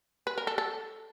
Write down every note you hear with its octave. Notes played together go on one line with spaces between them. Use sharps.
B4
A#4
A4
A4